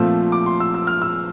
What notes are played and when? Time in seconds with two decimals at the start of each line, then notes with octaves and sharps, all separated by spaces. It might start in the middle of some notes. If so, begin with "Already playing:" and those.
Already playing: A#2 F3 A3 C4 E6
0.32 D6
0.46 C6
0.60 E6
0.74 E6
0.87 F6
1.02 E6